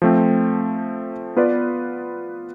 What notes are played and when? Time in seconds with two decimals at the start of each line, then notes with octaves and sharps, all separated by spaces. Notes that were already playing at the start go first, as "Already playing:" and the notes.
0.02 F3 A3 C4
1.36 B3 F4 B4 D5